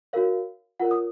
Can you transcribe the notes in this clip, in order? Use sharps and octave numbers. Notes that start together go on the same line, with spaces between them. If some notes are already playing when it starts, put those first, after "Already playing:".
D#4 F#4 A#4 C#5 F5
F4 A#4 C#5 F#5
D#6